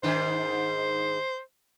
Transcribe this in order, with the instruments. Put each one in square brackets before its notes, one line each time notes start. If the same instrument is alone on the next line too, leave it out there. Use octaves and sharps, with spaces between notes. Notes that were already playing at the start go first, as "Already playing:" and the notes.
[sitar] G#2 D#3 D4 [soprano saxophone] C5